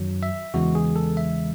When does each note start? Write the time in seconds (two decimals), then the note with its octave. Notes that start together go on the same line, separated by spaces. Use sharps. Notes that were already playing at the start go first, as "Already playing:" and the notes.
Already playing: F#2 D#3 F#3
0.23 E5
0.54 E2 C#3 E3 G#3 F#4
0.75 G#4
0.96 A4
1.17 E5